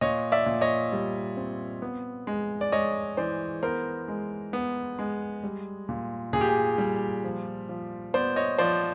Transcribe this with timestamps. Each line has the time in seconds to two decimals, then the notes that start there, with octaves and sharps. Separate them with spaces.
0.01 A#2 C#5 D#5
0.32 D5 E5
0.46 A#2
0.61 C#5 D#5
0.92 G3
1.37 C4
1.82 B3
2.27 G#3
2.61 D5
2.72 G#3 C#5 D#5
3.17 E3 C5 D5
3.63 B3 A#4 C5
4.08 G#3
4.53 B3
4.99 G#3
5.43 G3
5.89 A#2
6.33 A#2 G#4
6.41 G4
6.49 G#4
6.78 G3
7.24 F3
7.69 F3
8.14 B3 C5 D5
8.36 C#5 D#5
8.58 F3 C5 D5